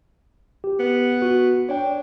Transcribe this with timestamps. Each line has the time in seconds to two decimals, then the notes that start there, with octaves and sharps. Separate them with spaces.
0.64 G4
0.79 B3
1.22 F#4
1.69 D4 C#5 G5